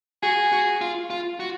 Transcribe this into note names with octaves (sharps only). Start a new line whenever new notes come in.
F#4 G#4
F#4
F4
F4
F#4